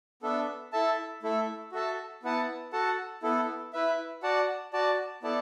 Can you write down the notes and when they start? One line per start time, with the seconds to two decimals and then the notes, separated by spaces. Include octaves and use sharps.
0.22 B3 D4 A4 E5
0.72 E4 A4 E5 A5
1.23 A3 E4 A4 E5
1.72 F#4 A4 E5 A5
2.23 B3 E4 B4 F#5 A5
2.73 F#4 A4 F#5 A5
3.22 B3 E4 A4
3.73 E4 B4 E5
4.23 F#4 D5 F#5 A5
4.73 F#4 D5 A5
5.23 B3 E4 A4 D5 A5